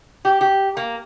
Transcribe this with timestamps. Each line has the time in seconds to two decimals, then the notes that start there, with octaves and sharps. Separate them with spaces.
0.25 G4
0.41 G4
0.77 A#3